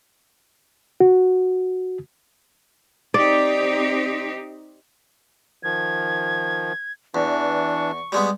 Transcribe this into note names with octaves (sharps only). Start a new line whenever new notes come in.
F#4
C4 D#4 G4 D5
D#3 F3 G#6
E2 E3 D4 C#6
G3 G#3 B3